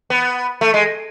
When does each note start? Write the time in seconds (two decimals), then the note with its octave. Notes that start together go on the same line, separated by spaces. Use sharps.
0.10 B3
0.61 A3
0.74 G#3